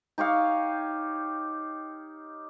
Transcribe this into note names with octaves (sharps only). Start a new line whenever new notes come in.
D#4 G4 C#5 F5